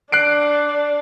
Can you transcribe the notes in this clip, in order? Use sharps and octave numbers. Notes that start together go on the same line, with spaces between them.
D4 F#6 C7 D7